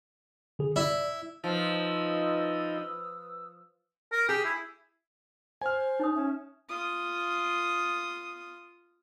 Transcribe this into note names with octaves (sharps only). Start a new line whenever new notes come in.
D3 G#4
E4 D5
F3 D#4 F4 B4 D#5 D#6 E6
A#4
G4 G#4
E4
C5 G#5 F6
D#4 C#5 D#6
C#4 E5
F4 D#6